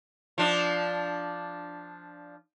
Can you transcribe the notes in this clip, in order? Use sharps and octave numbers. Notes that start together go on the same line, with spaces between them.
F3 D4